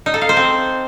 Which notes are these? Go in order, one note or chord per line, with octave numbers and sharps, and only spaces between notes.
D#4
A4
F5
C5
C4